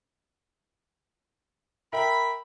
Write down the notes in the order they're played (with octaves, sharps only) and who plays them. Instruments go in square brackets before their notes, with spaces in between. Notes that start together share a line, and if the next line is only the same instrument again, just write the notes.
[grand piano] A#4 E5 G5 [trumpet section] B5